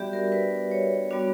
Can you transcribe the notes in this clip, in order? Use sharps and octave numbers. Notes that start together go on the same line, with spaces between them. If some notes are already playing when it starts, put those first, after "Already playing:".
Already playing: G3 B3 D4 F#4 G4 D5 E5
A#4
B4
C#5
G3 B3 D4 F#4